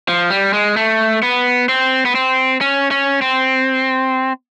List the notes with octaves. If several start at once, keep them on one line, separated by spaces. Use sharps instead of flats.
F3
G3
G#3
A3
B3
C4
B3
C4
C#4
C#4
C4